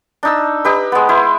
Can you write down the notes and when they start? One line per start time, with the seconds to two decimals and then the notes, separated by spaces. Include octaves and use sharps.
0.23 D4 D#4 E6
0.65 D#4 G4 B4
0.92 G#3 B3
1.09 E4 C5